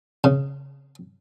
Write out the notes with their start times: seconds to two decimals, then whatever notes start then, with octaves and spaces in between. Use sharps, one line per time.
0.24 C#3